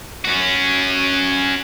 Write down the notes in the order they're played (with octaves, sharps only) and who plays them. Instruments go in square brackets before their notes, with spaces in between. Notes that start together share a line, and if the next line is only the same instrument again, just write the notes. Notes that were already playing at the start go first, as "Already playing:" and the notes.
[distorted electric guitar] C#4 F#4